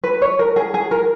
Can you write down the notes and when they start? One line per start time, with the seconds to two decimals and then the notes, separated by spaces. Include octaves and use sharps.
0.04 B4
0.22 C#5
0.39 A#4
0.56 G#4
0.74 G#4
0.91 A#4